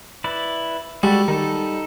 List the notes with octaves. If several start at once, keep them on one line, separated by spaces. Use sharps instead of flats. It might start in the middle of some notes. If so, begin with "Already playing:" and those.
E4 B4 D5
G3 G#3 F#4 A4 D5
D#3 D#4 A4